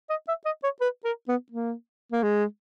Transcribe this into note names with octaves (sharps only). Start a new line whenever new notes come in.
D#5
E5
D#5
C#5
B4
A#4
B3
A#3
A#3
G#3